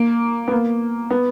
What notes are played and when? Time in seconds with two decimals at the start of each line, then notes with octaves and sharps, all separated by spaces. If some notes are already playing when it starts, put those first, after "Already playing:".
Already playing: A#3
0.48 B3
0.51 A#3
1.11 B3